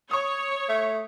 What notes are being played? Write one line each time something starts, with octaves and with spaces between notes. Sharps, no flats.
C#5 C#6 D#6
A3